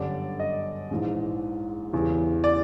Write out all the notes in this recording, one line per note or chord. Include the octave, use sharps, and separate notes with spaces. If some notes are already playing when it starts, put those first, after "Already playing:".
Already playing: G1 F#2 D3 G3 D5
D#5
A#1 G#2 E3
E2 C#3 E3 G3
D5